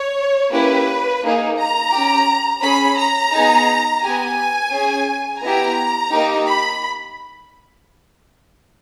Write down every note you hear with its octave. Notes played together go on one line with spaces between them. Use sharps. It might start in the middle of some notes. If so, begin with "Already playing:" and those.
Already playing: C#5
A#3 C#4 E4 G4 B4
A#3 D#4 G#4
A#5
C#4 G4
C#4 G#4 B5
A#5
B3 D#4 G#4
B3 G4 G#5
C#4 G#4
B3 E4 G4 A#5
A#3 D#4 G4
B5